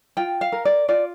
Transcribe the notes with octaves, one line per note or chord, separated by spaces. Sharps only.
F4 G5
F5
A#4
D5
F4 D5